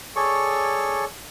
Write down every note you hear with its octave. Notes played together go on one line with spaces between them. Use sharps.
G#4 A4 C#5 D5 C#6